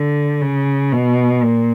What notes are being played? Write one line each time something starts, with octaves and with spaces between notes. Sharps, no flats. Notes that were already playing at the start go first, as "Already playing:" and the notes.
Already playing: D3
C#3
B2
A#2